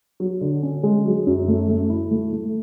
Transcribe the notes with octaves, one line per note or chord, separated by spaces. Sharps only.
F#3
D3
C#4
G#3
F#3
F#2
A3
A3
E4
A3
A3